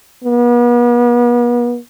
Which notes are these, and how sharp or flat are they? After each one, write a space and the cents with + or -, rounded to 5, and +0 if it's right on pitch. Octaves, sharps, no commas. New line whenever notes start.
B3 -40